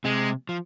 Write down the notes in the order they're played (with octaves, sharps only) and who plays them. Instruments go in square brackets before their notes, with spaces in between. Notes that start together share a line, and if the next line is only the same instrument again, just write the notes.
[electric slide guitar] C3 [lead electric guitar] G#3
[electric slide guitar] F3